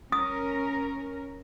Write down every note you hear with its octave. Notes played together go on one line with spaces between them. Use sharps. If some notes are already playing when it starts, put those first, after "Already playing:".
C#4 A#4 D#6